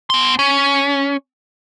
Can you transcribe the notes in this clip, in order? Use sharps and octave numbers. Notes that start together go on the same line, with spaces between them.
B3 C6
C#4